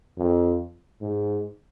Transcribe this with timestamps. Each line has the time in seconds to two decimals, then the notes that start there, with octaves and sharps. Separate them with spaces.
0.18 F2
1.01 G#2